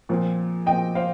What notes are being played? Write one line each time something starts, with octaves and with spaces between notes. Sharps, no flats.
A#2 F3 C4
A#2 F3 C4 D#5 G5
C5 F5